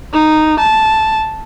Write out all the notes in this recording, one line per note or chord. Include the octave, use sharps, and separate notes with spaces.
D#4
A5